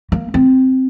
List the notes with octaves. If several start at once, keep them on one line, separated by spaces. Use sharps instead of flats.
A#3
C4